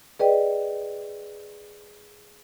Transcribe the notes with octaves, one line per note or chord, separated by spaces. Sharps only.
G#4 B4 D5 D#5 G5